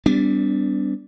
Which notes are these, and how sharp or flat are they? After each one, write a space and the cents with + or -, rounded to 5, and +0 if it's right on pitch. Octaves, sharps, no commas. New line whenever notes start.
G3 +5 B3 +35 D4 -15